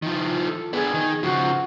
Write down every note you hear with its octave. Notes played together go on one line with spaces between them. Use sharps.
D#3 F3
A4
B3 D4 G#4
D#3
C#3 F3 F#4